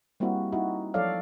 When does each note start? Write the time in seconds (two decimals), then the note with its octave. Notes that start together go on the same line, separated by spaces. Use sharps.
0.20 G3 A#3 C4 E4 F#4
0.52 D#4 E4 F#4
0.94 F3 F#3 A4 C#5 D5 F5